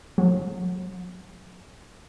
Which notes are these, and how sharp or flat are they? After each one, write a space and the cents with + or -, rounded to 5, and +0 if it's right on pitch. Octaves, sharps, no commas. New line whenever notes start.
F#3 -35